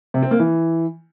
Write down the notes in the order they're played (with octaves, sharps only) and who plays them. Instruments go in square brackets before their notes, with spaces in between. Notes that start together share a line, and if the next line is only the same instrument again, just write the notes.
[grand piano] C3
C4
A#3
E3